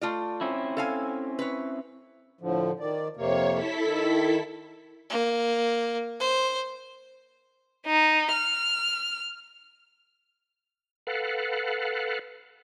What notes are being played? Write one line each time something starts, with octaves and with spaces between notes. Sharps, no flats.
A3 F4 D5
C4 C#4 E4
A4 F5 G#5
B4 C#5
A2 D3 F3
D#3 D5
F2 C3 A#3 C#5
E4 A4 B6
D#3
A#3
C5
D#4
F6
A4 B4 F5 F#5